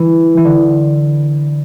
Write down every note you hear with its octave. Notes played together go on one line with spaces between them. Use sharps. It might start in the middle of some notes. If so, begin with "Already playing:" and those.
Already playing: E3
E3
D3